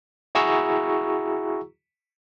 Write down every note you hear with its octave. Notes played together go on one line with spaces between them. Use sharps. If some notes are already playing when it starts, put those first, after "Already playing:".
E4 F#4 G#4 A#5 C#6 E6